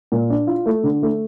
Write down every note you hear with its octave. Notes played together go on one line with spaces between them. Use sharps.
A#2
D4
F4
A3
D3
A3